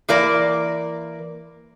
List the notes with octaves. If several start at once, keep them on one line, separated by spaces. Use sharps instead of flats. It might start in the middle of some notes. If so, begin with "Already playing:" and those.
E3 A#3 A#4 D5